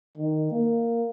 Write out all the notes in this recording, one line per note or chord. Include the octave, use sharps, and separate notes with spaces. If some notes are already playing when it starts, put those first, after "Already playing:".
D#3
A#3